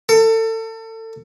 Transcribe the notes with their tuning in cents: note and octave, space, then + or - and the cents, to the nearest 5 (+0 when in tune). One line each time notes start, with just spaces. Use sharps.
A4 +30